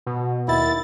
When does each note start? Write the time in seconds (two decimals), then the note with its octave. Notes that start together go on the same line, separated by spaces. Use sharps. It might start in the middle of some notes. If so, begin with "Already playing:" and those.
0.06 B2
0.48 D#2 E4 A6